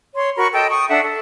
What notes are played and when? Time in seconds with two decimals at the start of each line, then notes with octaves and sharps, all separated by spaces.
0.15 C#5 C6
0.37 F#4 A#4 B5 C#6
0.54 A4 D#5 G5 A5
0.70 C#6 D#6
0.89 D4 A4 E5 F#5
1.03 A4